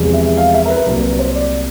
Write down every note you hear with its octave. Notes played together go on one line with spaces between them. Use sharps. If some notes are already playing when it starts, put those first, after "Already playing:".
Already playing: E2 C3 F3 G#3
E5
F5
E5
A#4
B4
C2 A#2 F#3 A#4
B4
C5
D5